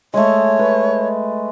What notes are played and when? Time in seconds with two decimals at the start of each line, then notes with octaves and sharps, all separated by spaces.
0.14 G#3 A3 C#5
0.59 B4